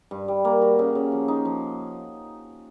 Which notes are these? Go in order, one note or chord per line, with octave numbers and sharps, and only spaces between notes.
G2
G3
A#3
F#4
C#3
C#3
F3
D#4
F3